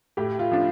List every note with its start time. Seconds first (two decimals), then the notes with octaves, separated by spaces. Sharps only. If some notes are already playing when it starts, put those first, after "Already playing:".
0.17 A2 G4
0.39 F4
0.52 F3 D4